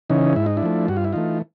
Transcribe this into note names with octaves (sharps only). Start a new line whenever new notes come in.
C#3 E3 C#4 D#4
G#2 E4
D#4
D4 E4
F3 A3
G2 F#4
F4
E4
E3 A3 D#4 F4